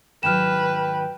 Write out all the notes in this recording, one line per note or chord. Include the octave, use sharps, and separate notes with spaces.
G#2 D#3 F#3 B4 G5 F6 E7